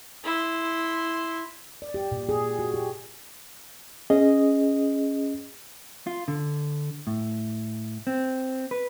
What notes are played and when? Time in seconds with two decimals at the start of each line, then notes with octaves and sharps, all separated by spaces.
0.24 E4 C6
1.82 D5
1.94 G4
2.12 A#2
2.29 G#4
2.59 F#4
2.74 G4
4.10 C#4 G#4 D#5
6.07 F4
6.28 D3
7.07 A2
8.07 C4
8.71 B4